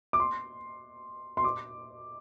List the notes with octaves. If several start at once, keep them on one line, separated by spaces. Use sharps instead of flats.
D6
C6
C6
D6